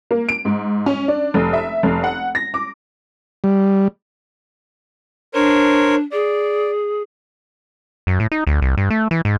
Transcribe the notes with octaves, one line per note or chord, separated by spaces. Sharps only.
A#3
D7
G#2
C#4
D4
F1
E5
F1
F#5
A#6
D6
G3
D4 A#4 C5 C#5
G#4 D5
F#2
A2
D#4
D2
C2
G2
A3
E3
G#2